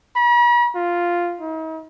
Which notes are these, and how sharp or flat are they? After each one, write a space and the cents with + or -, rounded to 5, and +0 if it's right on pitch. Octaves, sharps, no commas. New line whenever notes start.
B5 -45
F4 +0
D#4 +45